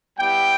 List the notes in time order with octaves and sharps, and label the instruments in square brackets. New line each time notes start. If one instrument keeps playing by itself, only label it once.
[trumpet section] G3 B3 E4 G4 G5